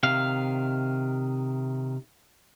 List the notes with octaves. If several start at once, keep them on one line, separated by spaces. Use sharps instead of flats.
C3 D#3 F5